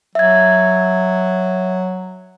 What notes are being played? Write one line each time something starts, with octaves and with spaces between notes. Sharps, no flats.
F#3 E5 G#6